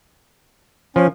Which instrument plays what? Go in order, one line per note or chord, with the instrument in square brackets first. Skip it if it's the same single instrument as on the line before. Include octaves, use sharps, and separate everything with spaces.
[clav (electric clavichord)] F3 [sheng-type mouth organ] C#4